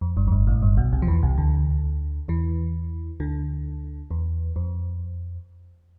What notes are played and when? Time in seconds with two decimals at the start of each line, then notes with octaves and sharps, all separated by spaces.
0.01 F2
0.17 G1 G2
0.27 F2
0.32 G1 G2
0.47 A1 A2
0.62 G1 G2
0.77 B1 B2
0.92 C2 C3
1.02 F3
1.07 E2 E3
1.23 C2 C3
1.38 D2 D3
2.28 E2 E3
3.20 D2 D3
4.11 E2
4.56 F2